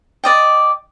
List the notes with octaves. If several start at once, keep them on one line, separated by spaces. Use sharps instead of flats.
D5 D#5 G5